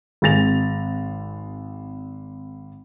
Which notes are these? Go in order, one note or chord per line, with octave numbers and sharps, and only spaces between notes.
G#1 G#3 C4 A6 A#6 F7